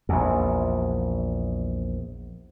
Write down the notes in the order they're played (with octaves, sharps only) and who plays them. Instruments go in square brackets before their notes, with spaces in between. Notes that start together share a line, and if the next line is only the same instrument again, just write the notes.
[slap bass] A#1 E2